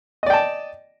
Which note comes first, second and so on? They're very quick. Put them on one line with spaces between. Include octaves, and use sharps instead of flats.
D#5 D5 G5 A5